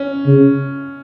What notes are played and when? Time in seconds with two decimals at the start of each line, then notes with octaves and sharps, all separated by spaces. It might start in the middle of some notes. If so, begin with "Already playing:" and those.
Already playing: C#4
0.27 C#3